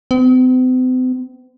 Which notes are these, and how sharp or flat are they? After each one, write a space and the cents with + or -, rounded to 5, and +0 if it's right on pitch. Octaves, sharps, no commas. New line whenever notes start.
C4 -45